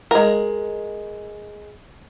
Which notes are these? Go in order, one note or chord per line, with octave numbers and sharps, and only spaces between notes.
G#3 A#4